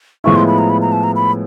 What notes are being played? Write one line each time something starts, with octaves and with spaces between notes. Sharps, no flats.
A2 F3 G#3 B3 E4 C#6
C6
B5
A#5
B5
A#5
A5
A#5
B5